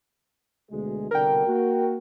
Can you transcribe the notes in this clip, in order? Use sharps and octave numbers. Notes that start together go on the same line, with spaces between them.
D2 B2 G#3
C2 B2 D3 A#4 G5
A#3 F#4